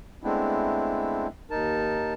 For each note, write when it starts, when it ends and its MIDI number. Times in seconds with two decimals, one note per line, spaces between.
0.24 1.27 56
0.24 1.27 57
0.24 1.27 59
0.24 1.27 60
0.24 1.27 62
0.24 1.27 64
1.50 2.14 39
1.50 2.14 63
1.50 2.14 70
1.50 2.14 81